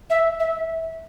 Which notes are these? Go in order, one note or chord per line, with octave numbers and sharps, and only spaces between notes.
E5
E5